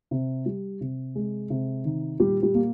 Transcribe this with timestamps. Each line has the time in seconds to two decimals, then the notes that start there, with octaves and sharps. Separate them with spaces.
0.11 C3
0.46 G3
0.81 C3
1.15 G#3
1.50 C3
1.85 D#3
2.20 A#2 G3 G4
2.42 G3 G4
2.55 A#3